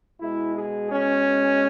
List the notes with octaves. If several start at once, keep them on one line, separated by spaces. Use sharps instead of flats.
B2 G#3 E4
G#4
C#4